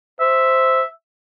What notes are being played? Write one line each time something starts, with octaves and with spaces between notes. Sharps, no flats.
C5 E5